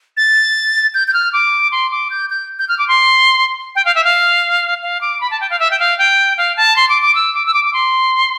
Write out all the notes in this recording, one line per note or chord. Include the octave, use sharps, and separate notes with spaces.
A6
G6
G6
F6
D6
C6
D6
G6
G6
G6
F6
D6
C6
G5
F5
E5
F5
F5
D6
B5
A5
G5
F5
E5
G5
F5
G5
F5
A5
C6
D6
D6
E6
D6
E6
D6
D6
C6